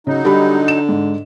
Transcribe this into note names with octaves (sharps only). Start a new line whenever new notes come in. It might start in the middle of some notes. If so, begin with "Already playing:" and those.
C#3 F#3 D#4
D3 G3 B5
E7
G#2